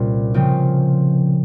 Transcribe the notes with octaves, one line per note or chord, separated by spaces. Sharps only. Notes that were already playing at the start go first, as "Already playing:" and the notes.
Already playing: C2 A#2 G3 C#4 F4
C#3 F3 C4 F4